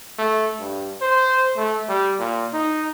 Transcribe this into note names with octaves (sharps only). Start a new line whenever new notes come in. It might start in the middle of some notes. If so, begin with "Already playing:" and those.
A3
G2
C5
A3
G3
A#2
D#4